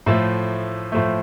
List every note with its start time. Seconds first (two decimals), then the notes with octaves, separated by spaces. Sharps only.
0.06 A2 F3 A3
0.92 A2 F3 A3